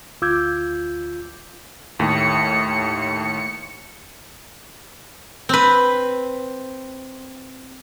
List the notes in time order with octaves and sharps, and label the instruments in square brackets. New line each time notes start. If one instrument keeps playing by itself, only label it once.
[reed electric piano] D2 F4 D6 E6 G6 G#6
[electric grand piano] D#2 A2 [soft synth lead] C#7
[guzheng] C4 B4